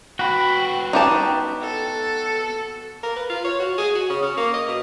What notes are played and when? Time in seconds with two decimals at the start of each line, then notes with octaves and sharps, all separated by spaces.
0.19 B3 F#4 G5 B5
0.93 D#4 G4 A5
1.61 A4
3.03 A#4
3.16 B4
3.30 F4
3.45 C#5
3.60 F#4
3.78 G#4
3.95 F#4
4.10 C#3
4.22 C#4
4.37 A#3
4.54 D#5
4.68 B2